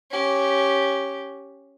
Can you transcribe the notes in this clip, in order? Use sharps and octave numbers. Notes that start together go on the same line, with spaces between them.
C#4 G4